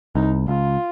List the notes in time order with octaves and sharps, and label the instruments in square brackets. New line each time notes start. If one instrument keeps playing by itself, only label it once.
[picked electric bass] C2 [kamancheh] D#4
[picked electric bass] C#2 [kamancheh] F4